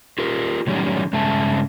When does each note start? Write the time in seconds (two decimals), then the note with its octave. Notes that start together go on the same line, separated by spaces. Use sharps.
0.19 F4 G4 A#4
0.67 A2 D#3 F#3 G3 C#4
1.13 G2 C#3 G#3 E5 A5